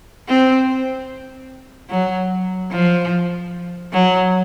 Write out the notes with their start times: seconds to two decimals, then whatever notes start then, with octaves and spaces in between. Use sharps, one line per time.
0.28 C4
1.90 F#3
2.71 F3
3.93 F#3